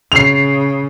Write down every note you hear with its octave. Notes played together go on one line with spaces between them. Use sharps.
C#3 C7 F7